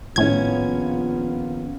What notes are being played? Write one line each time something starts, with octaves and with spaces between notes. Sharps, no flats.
A#1 A2 D#3 B3 C#4 F4 G#6